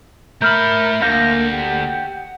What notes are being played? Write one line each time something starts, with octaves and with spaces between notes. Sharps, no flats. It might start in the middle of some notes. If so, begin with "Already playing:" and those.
A3 A#4 E5 B5 F6 G6
D2 A#3 F5 G6 A#6
G4 F#5